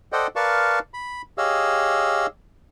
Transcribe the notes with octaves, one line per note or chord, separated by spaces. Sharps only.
A4 C5 D5 D#5 F#5 G5
A#4 B4 D5 F5 A5 C#6
B5
G4 G#4 C#5 D#5 F5 E6